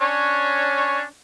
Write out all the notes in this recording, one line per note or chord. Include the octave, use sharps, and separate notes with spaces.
C#4 D4 C#5